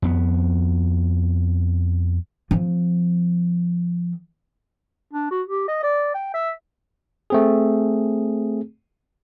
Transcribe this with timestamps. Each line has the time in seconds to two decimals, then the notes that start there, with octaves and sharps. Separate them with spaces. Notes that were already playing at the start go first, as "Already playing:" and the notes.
0.02 F2 B3
2.51 F3 C4
5.13 D4
5.31 F#4
5.48 G4
5.68 D#5
5.83 D5
6.14 G5
6.34 E5
7.30 A3 C4 G#4